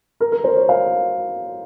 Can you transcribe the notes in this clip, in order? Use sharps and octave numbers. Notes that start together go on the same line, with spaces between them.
A#4
A#4
C5
C#5
F5